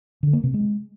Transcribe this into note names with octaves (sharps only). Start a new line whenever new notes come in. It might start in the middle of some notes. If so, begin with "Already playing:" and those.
D3
A#3
C3
G#3